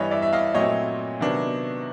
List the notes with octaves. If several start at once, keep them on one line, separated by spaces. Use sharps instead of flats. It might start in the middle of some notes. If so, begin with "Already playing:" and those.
Already playing: G2 E3 G3 C#5 D#5
D5 E5
E5
D#5 F5
A#2 F#3 A3 C4 C#5 D#5
C3 D#3 F#3 B3 D4